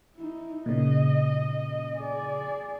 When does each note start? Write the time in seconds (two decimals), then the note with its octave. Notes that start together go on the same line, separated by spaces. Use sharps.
0.16 D#4 E4
0.66 A#2 C#3 D#5
1.98 G#4 D5